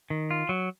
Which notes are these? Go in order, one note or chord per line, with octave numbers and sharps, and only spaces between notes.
D#3
F4
F#3